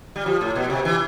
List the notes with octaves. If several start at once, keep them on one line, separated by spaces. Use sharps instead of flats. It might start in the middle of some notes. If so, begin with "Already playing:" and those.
G3
F3
A2
B2
C3
E3